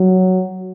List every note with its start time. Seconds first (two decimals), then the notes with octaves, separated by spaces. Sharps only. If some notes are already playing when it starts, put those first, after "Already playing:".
Already playing: F#3